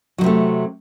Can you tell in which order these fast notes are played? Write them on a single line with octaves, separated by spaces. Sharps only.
F#3 D#3 C3 A3